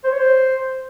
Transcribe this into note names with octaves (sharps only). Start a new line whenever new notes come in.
C5
C#5
C5